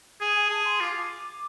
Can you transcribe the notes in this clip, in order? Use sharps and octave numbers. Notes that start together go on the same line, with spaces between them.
G#4 G#5
G#5
G#4 A5
C6
F4 D6